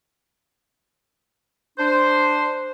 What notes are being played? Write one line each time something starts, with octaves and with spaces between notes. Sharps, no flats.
D4 C5